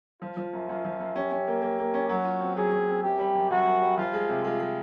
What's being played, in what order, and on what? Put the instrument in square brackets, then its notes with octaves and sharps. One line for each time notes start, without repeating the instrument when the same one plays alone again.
[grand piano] F3 [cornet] F4
[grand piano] F3
F#2
[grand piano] F#2 [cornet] F4
[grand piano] F3
F#2
[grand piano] C#4 [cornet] G4
[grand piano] C#4
A#3
A#3
A#3
C#4
[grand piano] F#3 [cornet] F#4
[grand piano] F4
C4
[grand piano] F#3 [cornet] G#4
[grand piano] F#3
C4
[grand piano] F#2 [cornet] G4
[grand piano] G3
F#2
[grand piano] F#2 [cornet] F#4
[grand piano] F#2
G3
[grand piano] F3 [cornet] F4
[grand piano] G#3
C3
[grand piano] G#3 [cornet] F4
[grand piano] G#3